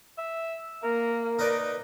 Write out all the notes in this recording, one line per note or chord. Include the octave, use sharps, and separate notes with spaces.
E5
A#3 A#4
D#4 A#4 B4 D5